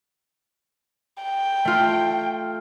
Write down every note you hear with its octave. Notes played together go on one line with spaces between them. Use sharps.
G5
A3 F4